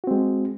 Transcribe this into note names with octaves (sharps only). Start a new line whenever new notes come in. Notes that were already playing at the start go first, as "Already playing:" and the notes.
G#3 C4 F#4